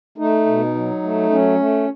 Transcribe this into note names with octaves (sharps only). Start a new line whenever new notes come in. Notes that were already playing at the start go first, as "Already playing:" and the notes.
A3 D#4
B2
F#3
A3
F#3 C#4
A3